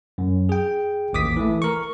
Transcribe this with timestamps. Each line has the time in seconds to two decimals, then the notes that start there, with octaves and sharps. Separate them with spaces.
0.18 F#2
0.49 G#4 G5
1.13 A1 D#2 D6 D#6 B6
1.36 E3 A3
1.62 A#4 C#6